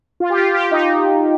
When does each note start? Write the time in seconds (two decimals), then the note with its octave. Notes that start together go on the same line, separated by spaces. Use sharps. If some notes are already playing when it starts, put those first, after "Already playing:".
0.20 F4
0.30 G4
0.37 F4
0.54 G4
0.71 D#4